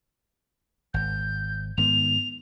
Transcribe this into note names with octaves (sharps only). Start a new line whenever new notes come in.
G#1 G6
G#2 D#3 B3 F7